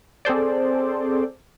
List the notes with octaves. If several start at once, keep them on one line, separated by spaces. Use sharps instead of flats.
C4 G#4 A4 C5 D5